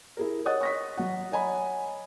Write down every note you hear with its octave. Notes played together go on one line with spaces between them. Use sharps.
E4 G#4 A#4
C#5 D#5 F#5 D#6 F#6 A6
C#6 A#6 B6
F#3 F#5
C#5 D#5 F#5 G#5 A#5 B5